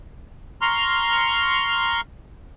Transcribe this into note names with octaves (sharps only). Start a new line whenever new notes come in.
A#5 C6 C#6 F6